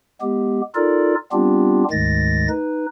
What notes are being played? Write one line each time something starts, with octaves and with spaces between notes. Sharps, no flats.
G#3 B3 G4
D#4 F4 A4 A#4 D5
G3 B3 C4 D4 F4 G4
D2 G#2 D#3 G#3 A6 A#6
D#4 B4